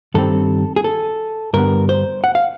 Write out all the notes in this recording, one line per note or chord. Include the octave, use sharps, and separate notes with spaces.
G2 D#3 G3 C4 A4
G#4
A4
G2 D3 G3 B3 A#4
C5
F#5
F5